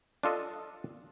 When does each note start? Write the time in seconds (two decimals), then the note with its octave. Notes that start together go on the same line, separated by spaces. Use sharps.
0.23 D4 F4 A4 D#5